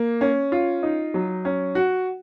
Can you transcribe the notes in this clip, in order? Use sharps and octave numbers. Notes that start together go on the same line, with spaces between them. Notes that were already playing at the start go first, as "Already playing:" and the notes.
Already playing: A#3
C#4
F4
D#4
F#3
C#4
F#4